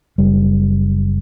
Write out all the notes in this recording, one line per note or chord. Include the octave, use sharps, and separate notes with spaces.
F#1 G3